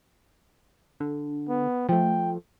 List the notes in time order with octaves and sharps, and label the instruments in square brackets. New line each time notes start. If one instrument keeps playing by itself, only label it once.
[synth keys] D3
[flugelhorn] B3
[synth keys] F3 A3 [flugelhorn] G5